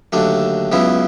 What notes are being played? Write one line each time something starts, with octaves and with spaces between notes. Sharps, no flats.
D#2 D3 F#3 A3 D4
C#2 C#3 F#3 B3 E4